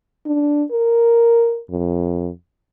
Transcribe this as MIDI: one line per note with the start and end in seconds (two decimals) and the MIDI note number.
0.27 0.63 62
0.72 1.60 70
1.70 2.30 41